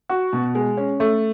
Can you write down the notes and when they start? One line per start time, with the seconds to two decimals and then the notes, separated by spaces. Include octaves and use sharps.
0.09 F#4
0.33 B2
0.55 G#3
0.77 C#4
1.00 A3